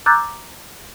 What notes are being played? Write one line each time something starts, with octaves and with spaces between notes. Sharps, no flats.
A#5 D6 E6 F#6 G6 A6